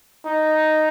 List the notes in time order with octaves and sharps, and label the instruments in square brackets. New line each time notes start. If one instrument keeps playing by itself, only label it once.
[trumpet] D#4